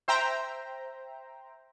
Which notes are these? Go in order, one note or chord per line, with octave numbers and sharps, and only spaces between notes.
C5 E5 G5 A#5